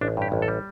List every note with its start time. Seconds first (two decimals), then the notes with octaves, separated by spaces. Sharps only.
0.01 A1 D4
0.17 G2 G4
0.32 A1
0.42 A4
0.48 G3